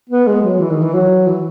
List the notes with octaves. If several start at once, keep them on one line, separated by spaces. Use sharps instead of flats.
B3
G#3
F#3
E3
D#3
E3
F#3
E3